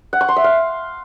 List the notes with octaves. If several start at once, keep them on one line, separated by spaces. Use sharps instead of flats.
F#5
C#6
C6
E5
F5